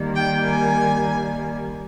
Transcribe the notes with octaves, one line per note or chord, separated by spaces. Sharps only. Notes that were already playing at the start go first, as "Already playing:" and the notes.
Already playing: D#3 G3 A#3
G5
G#5